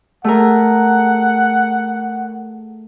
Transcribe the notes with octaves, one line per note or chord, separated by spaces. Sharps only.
A3 G#4 A#4 F#5